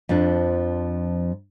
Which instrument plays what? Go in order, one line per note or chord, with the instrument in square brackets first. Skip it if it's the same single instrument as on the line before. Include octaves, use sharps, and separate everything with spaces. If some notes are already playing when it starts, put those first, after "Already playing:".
[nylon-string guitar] F2 F3 D4